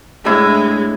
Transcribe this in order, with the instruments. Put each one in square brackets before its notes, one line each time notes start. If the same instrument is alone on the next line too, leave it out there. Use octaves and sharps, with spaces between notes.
[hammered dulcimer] A2 D4 E4 [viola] G#3